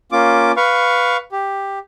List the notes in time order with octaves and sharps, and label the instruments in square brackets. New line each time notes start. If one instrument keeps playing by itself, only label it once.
[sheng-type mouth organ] A#3 C#4 F4 D6
B4 F5 C#6
G4